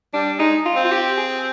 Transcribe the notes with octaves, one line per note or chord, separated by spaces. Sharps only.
G3 D4
G#3 D#4
F4
C4
F4
G4
G#4